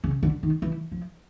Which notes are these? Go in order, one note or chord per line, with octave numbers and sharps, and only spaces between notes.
C#3
D3
D#3
E3
F3